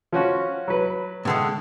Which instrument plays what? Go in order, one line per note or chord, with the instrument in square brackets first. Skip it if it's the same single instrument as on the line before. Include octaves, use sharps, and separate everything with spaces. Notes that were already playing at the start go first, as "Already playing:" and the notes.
[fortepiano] F3 C#4 F#4
F#3 B4
[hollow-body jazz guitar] A2 D3 G#3